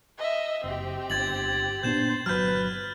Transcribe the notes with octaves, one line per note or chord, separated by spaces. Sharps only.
D#5 E5
F#1 C4 G4
G1 G#6 A6 F#7
A#2 B3 D4 C5 G6 E7
G1 F#3 B4 F6 G6